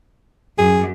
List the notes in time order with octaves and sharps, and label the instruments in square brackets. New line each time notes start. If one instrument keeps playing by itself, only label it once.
[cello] F#2 [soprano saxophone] G#4